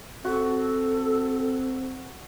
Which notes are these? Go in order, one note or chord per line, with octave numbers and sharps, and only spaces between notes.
C4 F#4 A4